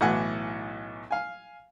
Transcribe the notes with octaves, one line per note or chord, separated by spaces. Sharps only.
B1 A2 E3 F#5 G#5
F5 G#5